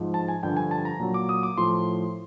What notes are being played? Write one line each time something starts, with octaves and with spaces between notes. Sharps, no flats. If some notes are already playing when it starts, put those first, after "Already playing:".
Already playing: G#2 F3
A5
G#5
G2 D3 F3 G5
G#5
A5
A#5
A#2 F#3
D6
D#6
D6
A2 F3 C6